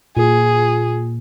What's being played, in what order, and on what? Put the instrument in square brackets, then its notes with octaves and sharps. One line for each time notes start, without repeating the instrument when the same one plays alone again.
[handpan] A#2 [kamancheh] G#4